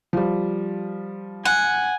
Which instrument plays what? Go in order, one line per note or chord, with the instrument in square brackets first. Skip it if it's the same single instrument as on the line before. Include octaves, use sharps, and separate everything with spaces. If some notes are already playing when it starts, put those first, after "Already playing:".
[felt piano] F3 G3
[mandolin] F#5 [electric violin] G#5